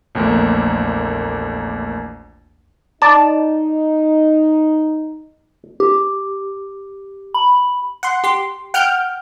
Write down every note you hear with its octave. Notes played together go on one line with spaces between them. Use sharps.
A#1 E2 A3 A#3
D#4 D5 A5
G4
B5
F#5 C6
G4 C6
F#5 G5 F6 G6 D7